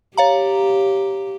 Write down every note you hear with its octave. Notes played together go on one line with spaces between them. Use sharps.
G4 C#5 F5 A#5